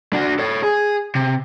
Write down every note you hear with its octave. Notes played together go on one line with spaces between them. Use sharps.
D4 F#4
A4 C#5
G#4
C3